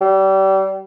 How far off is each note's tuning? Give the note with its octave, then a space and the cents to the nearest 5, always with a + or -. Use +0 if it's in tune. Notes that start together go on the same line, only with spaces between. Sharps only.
G3 -30